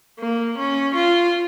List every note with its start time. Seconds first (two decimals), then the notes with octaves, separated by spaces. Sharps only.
0.19 A#3
0.57 C#4
0.94 F4